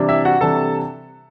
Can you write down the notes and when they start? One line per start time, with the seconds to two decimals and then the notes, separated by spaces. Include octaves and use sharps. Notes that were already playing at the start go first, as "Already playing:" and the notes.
Already playing: C3 E3 G3 D4
0.09 E4 E5
0.25 F#4 F#5
0.41 C3 E3 G3 D4 A4 A5